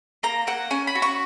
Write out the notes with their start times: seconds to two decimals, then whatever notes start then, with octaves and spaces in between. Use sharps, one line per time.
0.23 A#3 A#5
0.47 A#3 F#5
0.71 C#4 G#5
0.87 B5
0.95 F#4
1.02 C#6